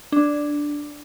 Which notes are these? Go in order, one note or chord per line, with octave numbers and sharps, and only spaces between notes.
D4